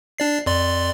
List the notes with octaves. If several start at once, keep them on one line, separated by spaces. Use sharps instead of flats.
D4 D5 C7
F2 D5 C6